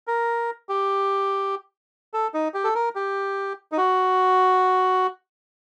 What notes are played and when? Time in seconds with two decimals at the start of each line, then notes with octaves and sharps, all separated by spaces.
0.07 A#4
0.69 G4
2.14 A4
2.34 D#4
2.54 G4
2.64 A4
2.75 A#4
2.95 G4
3.72 D#4
3.78 F#4